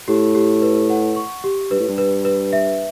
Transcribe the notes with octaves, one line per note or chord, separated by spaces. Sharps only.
A2 G4
G4
B4
F#5
C#6
G4
G2 B4
A2
G2
B4
B4
E5